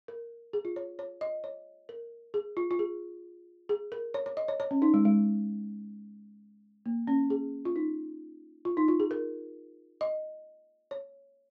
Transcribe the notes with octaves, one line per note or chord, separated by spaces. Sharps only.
A#4
G#4
F4
C#5
C#5
D#5
C#5
A#4
G#4
F4
F4
G#4
G#4
A#4
C#5
C#5
D#5
C#5
C#5
C#4
D#4
G#3
G#3
A#3
C#4
G#4
F4
D#4
F4
D#4
F4
G#4
A#4
D#5
C#5